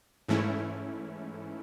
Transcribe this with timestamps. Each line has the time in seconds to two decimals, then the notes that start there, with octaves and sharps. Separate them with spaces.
0.28 G#2 E3 A3 C#4 E4